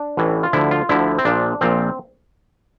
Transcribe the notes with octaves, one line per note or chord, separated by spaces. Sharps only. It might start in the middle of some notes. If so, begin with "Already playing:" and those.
Already playing: D4
A1 A2 E3
F4
D2 D3 F3 E4
F4
D2 D3 F3 E4
C4
A#1 A#2 F3 D4
A#1 A#2 F3 C4